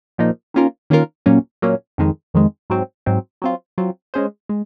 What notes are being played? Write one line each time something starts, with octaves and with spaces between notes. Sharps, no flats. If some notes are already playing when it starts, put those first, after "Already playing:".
A#2 F3 A#3 D#4
D#3 A#3 C#4 F4 A#4
D#3 A#3 C#4 F4 A#4
A#2 F#3 A#3 C#4
A#2 F#3 A#3 C#4
F2 D#3 G#3
F2 D#3 G#3
G#2 F#3 C4
G#2 F#3 C4
F#3 C4 F4
F#3 C4 F4
G#3 C#4 G#4 C5
G#3